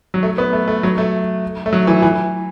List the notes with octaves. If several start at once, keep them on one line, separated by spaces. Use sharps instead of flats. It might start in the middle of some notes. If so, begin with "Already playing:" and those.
F#3
A3
B3
A3
A3
F#3
A3
A3
F#3
E3
E3